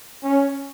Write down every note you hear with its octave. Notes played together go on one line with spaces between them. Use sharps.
C#4